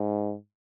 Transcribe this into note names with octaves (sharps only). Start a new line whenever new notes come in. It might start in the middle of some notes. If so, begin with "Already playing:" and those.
Already playing: G#2